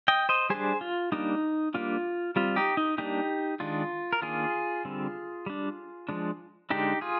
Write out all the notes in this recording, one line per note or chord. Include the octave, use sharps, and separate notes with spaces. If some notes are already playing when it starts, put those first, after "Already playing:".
D#5 G5
C5 D#5
G3 D4 G#4 C5
F4
G3 A#3 D4 D#4
G3 A#3 D4 F4
G3 C4 F4
D#4 G4
D#4
G3 A#3 D4 D#4 G4
D#3 G#3 D4 F4
A#4
D#3 A#3 D4 F4 G#4
D3 G3 C4
G3 D4
F3 G#3 D4
D3 G#3 D4 D#4 G4
F4 G#4